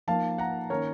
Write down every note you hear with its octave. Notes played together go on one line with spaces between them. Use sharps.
F3 A#3 D#4 F5 A5
F#5 A#5
D#3 A#3 C#4 A#4 C#5